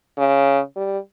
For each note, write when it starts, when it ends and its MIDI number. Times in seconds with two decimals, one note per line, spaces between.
0.18 0.60 49
0.76 0.98 55